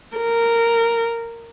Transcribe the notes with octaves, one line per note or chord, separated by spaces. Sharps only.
A#4